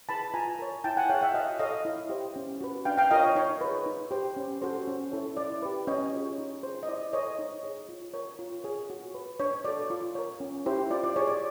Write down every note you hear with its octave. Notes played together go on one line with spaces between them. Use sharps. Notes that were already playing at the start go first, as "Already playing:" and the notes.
E4 G#4 B4 A5 B5
F4 G#5 A#5
A#4 C#5
E4 G5 A5
F#5 G#5
G#4 C#5 F5 G5
E5 F#5
F#4 D#5 F5
A4 C#5 D#5 F5
E4
G4 C5
C#4
F#4 B4
D4 F5 G5
F5 G5
F4 A#4 C#5 D#5 F5
C#5
D#4 C#5
G#4 B4
D#4
G4 C5
C#4
F#4 A4 C5
C#4
E4 A4 C#5
E4 D5
G4 B4
C#4 C#5 D#5
F4 G#4 C#5
D#4
G#4 C5
D#5
E4 D5
A4 C5 C#5 D#5
D#4
G#4 C#5
F4
A#4 C#5
F4
G#4 C#5
F#4
B4
D4 C#5
F#4 A4 D5
F4
A#4 C#5
C#4
E4 G4 C5
F4 D5
D5
G#4 C5 C#5
D5